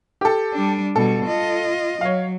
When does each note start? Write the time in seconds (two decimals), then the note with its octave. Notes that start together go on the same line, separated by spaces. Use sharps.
0.21 G4 A4
0.53 G3 D4
0.96 B2 G3 A4
1.27 F4 D#5
2.01 F#3 C#5 F5